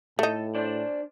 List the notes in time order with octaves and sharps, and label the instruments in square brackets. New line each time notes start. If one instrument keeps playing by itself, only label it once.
[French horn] A2 [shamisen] A3 D#4 [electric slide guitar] A4
[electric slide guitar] D4 C5 D5